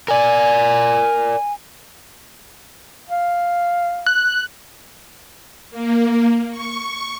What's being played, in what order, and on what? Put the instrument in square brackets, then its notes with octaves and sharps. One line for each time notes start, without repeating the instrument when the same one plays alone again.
[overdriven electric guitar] A#4 D5 [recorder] G#5
[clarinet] F5
[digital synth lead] F#6
[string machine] A#3
C#6